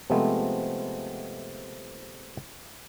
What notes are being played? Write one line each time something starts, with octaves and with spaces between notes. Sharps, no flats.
C3 F3 G#3 A3 B3 C4